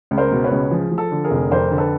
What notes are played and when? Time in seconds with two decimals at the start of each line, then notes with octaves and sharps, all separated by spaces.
0.11 C#2
0.18 A#4 C5
0.31 B2
0.44 B4 C#5
0.51 C#2
0.71 F3 G#4
0.91 F3
0.98 A4
1.12 D3
1.24 G#4 A#4
1.31 F1
1.51 F2 A#4 C5
1.71 D3
1.78 A4 B4